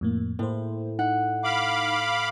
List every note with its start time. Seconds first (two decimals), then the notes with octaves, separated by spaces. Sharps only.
0.01 F2 A2 A#3
0.39 A2 A#3 C5
0.99 D#4 F#5
1.44 F5 B5 D6